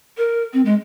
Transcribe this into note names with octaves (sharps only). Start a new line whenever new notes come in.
A#4
C4
G#3